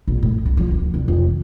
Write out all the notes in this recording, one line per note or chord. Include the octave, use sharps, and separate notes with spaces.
A#1
A2
C2
F3
D2
C2
F2
D#3